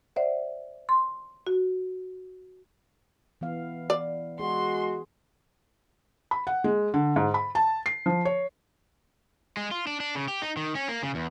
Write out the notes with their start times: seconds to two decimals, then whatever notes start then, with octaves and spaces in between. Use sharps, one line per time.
0.16 C5 D5 E5 F#5
0.89 C6
1.47 F#4
3.41 E3 B3 F5
3.90 D5
4.40 G#3 F#4 G#4 C6
6.31 B5
6.47 F#5
6.64 G#3
6.94 D3
7.16 G#2
7.34 B5
7.55 A5
7.86 C7
8.06 F3
8.25 C#5
9.57 G#3
9.71 F4
9.87 D4
10.00 D4
10.15 C#3
10.28 G4
10.42 D#4
10.57 D#3
10.75 C#4
10.89 A#3
11.03 C#3
11.15 E2